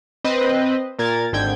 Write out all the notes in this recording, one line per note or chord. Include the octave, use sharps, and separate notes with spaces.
C4 B4 C5 D#5
A#2 A#4 G#6 A6
G#1 G#2 D3 G5 G6 G#6